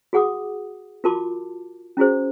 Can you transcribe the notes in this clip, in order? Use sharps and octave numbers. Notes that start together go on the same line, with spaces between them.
F#4 G#4 F#5 D6 D#6
F4 F#4 A#4 A5 C6 D6
C#4 E4 F#4 G#4 C5